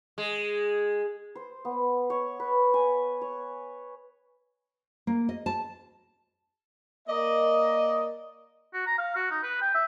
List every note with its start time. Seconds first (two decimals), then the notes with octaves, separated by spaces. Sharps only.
0.18 G#3
1.35 C5
1.65 B3
2.10 C#5
2.40 B4
2.74 G#5
3.21 C#5
5.07 A#3
5.29 D#5
5.46 A5
7.08 A#3 A#4 D5 D#5
8.74 F#4
8.87 A#5
8.98 F5
9.15 F#4
9.31 D#4
9.43 B4
9.61 G5
9.74 E5